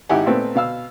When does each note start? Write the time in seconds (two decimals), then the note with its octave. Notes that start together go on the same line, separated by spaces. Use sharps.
0.09 G#1 D#4 E4 G4 F#5 G#5
0.26 A#2 A3 B3 C4
0.55 B2 F5 E6